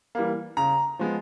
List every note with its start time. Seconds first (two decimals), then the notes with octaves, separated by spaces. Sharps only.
0.15 E3 G3 A#3
0.57 C#3 A#5
0.99 F3 G#3 B3